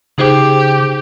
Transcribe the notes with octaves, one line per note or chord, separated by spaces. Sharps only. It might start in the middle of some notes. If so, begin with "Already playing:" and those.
C#3 D#4 G4 G#4 C5